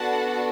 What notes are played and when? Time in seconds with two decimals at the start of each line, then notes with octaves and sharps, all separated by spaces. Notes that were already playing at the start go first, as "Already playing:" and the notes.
Already playing: B3 D4 F#4 A4 F#5 A5